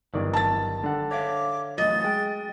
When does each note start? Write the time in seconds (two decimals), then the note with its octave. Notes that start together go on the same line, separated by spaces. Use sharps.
0.14 G1 F#2 D#3 E3 D5
0.33 A5 A6
0.84 D3 G3 F#5
1.11 C#5 E5 F5 D6
1.78 E2 A2 F#3 D#5 A6
2.04 G#3 G5